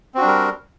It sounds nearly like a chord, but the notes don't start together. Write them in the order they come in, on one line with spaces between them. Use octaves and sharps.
C4 F#4 D4 G3 A#4